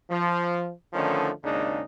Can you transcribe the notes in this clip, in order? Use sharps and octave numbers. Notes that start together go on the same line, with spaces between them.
F3
D3 D#3 F3 A3 C#4 D#4
G#1 D#2 C#3 G#3 D4 D#4